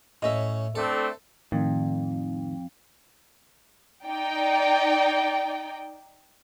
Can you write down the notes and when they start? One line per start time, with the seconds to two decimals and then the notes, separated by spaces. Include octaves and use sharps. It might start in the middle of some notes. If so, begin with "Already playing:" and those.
0.22 A2 C#4 D#5 E5
0.75 A3 C4 D4 A4
1.52 F2 A2 D#3
4.06 D#4 D5 G5